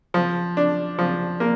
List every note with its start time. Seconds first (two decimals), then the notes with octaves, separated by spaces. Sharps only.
0.14 F3
0.57 D4
0.99 F3
1.40 A#3